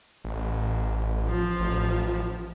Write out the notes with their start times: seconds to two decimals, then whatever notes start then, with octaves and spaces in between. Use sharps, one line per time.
0.25 A1
1.26 F3
1.60 A1